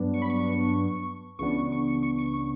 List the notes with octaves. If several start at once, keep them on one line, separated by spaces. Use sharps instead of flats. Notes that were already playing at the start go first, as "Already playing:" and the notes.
Already playing: G2 F#3 B3 D4
C#6
B5
C#6
C#2 C#3 E3 B3 D4 C#6
C#6
C#6
C#6
C#6
C#6